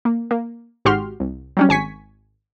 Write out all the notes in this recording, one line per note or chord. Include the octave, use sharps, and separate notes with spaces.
A#3
A#3
G#1 G#2 F#4 G4 C6 F6
C2
F#3 G3 C#4
G#1 G#5 C#6 B6